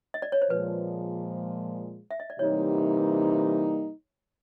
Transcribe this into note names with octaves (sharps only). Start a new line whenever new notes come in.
D#5
D5
C#5
C5
A#2 F3 G#3 B4
E5
D#5
D5
C3 E3 G3 A#3 D#4 C#5